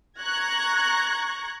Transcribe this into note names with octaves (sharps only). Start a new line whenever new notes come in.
A#5 C#6 F#6 G#6 A#6